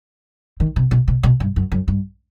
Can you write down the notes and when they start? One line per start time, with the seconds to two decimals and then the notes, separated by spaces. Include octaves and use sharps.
0.60 D#3
0.76 C3
0.91 B2
1.08 B2
1.23 B2
1.40 G2
1.56 F#2
1.72 F#2
1.88 G2